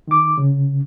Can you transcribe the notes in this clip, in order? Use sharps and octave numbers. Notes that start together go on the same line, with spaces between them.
D#3 D6
C#3